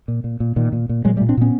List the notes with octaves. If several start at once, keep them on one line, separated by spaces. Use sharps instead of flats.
A#2
A#2
A#2
A#2 D#3
A#2
A#2
A#2 F#3 G#3
G3 A3
A#2
C4 D4
A#2 B3 C#4